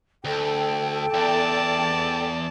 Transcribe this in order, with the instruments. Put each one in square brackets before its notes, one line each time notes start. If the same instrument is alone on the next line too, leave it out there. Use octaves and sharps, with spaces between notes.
[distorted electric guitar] D2 [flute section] A4 G5
[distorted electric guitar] E2 [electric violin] D5 A5